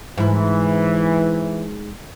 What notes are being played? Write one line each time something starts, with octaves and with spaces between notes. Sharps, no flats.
G#2 E3 E4